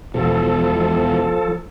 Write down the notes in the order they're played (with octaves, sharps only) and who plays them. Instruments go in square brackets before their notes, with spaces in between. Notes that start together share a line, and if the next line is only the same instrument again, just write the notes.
[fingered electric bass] E1 B2 [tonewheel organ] F3 A4